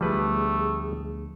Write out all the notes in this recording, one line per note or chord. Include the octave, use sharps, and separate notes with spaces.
D2 F3 G3 A3 G#4 B4